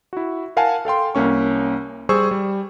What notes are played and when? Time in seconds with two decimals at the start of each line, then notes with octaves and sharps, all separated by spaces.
0.13 E4 F#4
0.57 A#4 F5 F#5 G#5 A5
0.85 A4 F5 G5 C6
1.15 C2 A#3 C#4 C#6
2.09 G3 G#4 C5 C#6 E6
2.31 G3